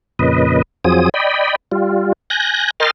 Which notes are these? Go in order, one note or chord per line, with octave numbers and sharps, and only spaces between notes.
F2 A#2 C#3 B4 D#5
F2 F3 F#3 C4 G#4 D#6
D5 D#5 G5 B5
G3 F4
G#5 F#6 G6 A#6
A#4 D#5 G5 C6 F6 A6